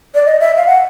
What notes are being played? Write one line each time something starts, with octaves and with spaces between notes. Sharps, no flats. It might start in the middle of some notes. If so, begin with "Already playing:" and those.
D5
D#5
E5
F5
F#5